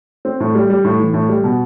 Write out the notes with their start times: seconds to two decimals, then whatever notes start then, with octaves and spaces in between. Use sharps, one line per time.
0.25 C4
0.40 A2
0.55 G3
0.70 G3
0.84 A2
1.00 E3
1.13 A2
1.29 G3
1.44 B2